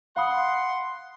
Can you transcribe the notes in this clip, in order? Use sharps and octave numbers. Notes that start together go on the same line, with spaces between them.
F5 F#5 B5 C6 D#6